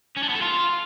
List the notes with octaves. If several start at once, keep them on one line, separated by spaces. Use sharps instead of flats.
C#4
D4
B3
A4
F4